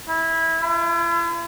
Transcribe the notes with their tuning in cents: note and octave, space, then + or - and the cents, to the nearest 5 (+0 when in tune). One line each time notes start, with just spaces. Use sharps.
E4 -15
E4 +45